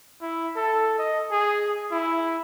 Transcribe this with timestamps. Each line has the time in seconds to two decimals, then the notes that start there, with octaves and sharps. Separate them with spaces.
0.22 E4
0.56 A4
0.99 D#5
1.31 G#4
1.91 E4